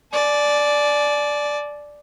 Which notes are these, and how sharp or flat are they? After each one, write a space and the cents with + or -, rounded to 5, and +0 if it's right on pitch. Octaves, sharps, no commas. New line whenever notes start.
D5 +0 G#5 +45